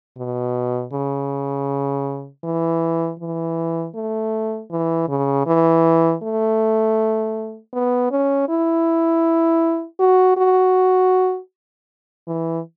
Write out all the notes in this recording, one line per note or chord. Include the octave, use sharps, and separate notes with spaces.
B2
C#3
E3
E3
A3
E3
C#3
E3
A3
B3
C#4
E4
F#4
F#4
E3